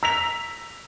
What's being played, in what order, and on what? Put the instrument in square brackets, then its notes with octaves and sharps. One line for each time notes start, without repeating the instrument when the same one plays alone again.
[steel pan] A#5 [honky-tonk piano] E6 B6 F7